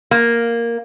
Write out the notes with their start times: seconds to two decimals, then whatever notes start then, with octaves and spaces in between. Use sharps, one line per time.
0.11 A#3